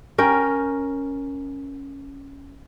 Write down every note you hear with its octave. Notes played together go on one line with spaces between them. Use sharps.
C#4 A#4 G5